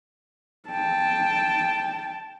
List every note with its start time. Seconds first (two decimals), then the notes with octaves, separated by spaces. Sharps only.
0.70 G5 A5